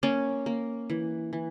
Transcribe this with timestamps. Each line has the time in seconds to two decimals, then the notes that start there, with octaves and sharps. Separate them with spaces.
0.03 A#3 C#4
0.46 A#3
0.90 E3
1.33 E3